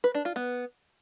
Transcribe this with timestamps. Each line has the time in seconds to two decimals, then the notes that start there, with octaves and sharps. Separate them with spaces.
0.04 B4
0.15 D4
0.25 F4
0.36 B3